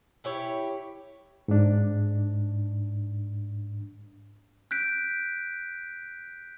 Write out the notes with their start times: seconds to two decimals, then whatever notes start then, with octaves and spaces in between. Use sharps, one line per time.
0.24 E4 G4 C#5
1.48 G#2 D4
4.71 F#6 G6 B6 D7